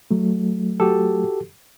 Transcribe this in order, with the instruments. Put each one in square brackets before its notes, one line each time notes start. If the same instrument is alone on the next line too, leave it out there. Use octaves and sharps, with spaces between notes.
[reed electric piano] F#3 A3
[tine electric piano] F#4 G4 A4